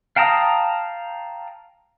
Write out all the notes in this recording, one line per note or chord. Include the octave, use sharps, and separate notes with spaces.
F5 G5 A5 A#5 D#6